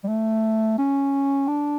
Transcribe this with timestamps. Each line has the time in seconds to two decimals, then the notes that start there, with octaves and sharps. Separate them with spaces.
0.04 G3
0.09 A3
0.79 C#4
1.48 D4